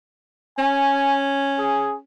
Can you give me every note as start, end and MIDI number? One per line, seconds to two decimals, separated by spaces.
0.59 2.01 61
0.59 1.20 80
1.59 1.95 68